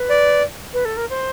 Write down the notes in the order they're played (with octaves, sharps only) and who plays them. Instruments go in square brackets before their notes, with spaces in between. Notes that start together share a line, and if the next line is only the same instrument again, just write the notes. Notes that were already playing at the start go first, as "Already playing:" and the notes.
Already playing: [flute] B4
[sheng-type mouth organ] D5
[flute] B4
A4
A#4
C5